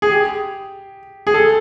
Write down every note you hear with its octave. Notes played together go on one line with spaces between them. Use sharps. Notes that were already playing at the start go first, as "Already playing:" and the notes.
G#4
G4
G#4
A4